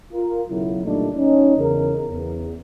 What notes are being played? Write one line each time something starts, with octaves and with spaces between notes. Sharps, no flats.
F4 A#4
B1 C#3 F#3 E4
A#2 D3 G3 A3 D4 D#4
C#4 D#4
E2 C#3 A#4
E2